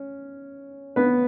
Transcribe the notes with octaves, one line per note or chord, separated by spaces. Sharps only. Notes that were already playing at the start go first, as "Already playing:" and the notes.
Already playing: C#4
B3 B4